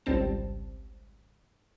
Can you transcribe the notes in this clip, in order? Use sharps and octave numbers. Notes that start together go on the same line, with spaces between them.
G#1 C#2 G3 C4 A5